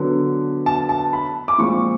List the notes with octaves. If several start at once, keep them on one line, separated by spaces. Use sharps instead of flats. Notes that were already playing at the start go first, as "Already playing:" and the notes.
Already playing: D3 F#3 B3
A5
A5
B5
D6
A#2 F3 G#3 C4 C#6